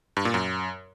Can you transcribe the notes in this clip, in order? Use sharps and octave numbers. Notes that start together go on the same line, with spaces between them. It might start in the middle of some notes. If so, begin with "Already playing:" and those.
G2
A#2
F#2